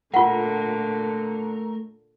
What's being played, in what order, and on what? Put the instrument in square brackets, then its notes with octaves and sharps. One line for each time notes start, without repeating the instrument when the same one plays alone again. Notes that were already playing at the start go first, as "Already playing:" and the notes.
[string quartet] A#2 D3 [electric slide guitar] A3 A#4 [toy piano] F4 F#5